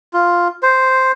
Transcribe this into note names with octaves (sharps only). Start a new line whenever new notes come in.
F4
C5